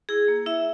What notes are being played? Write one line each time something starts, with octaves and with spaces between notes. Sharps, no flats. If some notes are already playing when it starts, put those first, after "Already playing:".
E4 G#4
A#3
E4 E5